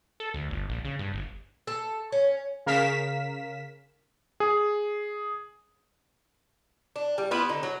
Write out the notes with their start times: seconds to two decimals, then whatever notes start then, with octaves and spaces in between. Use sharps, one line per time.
0.20 A4
0.34 D2
0.50 G1
0.70 A#1
0.85 C#3
0.99 G2
1.14 G1
1.67 A4
2.12 C#4
2.66 C#3 A#4 F5 B6 E7
4.40 G#4
6.96 D4
7.18 G3
7.31 B3 E4 F4 B4
7.49 D3 D#4
7.63 F#3